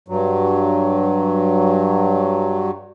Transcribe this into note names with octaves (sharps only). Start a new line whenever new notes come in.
G2 F#3